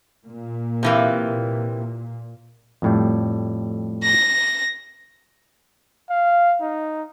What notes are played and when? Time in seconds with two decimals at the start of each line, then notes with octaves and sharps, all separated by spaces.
0.23 A#2
0.83 C3 E3 A#3
2.82 F2 A2 G3
4.03 A#6
6.10 F5
6.61 D#4